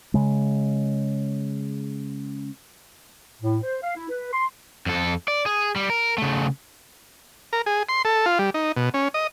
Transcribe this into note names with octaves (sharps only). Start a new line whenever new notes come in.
C#3 G#3
A2
C5
F5
E4
B4
C6
F2 A4
D5
G#4
G3
A#4
C#3 A3
A#4
G#4
C6
A4
F4
G3
D#4
B2
C#4
D#5